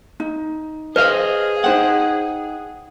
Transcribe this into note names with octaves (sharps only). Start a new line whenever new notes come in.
D#4
G#4 B4 C5 D#5 F5
D#4 C5 F#5 G5